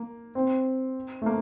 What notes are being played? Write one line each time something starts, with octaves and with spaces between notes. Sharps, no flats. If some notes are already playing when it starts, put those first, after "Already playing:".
Already playing: A#3
C4
A3
A#3